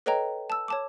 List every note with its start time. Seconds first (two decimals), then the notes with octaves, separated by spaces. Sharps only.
0.06 A4 B4 C#5 D#5 G5 A#5
0.50 A5 E6
0.68 C#5 A5 D6